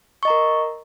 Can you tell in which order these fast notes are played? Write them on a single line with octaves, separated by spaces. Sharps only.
C#6 D#5 A#5 A#4